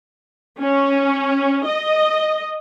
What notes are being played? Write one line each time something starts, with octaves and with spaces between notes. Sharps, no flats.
C#4
D#5